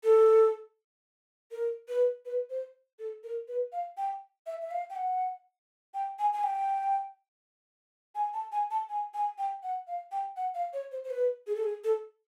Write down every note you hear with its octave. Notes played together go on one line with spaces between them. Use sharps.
A4
A#4
B4
B4
C5
A4
A#4
B4
F5
G5
E5
E5
F5
G5
F#5
G5
G#5
G#5
G5
G#5
A5
G#5
A5
G#5
G#5
G5
F#5
F5
G5
F#5
F5
C#5
C5
C5
B4
G#4
A4
G#4
A4